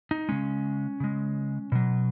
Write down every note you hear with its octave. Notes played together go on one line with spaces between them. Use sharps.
D#4
C#3 G#3 C#4
C#3 G#3
B2 F#3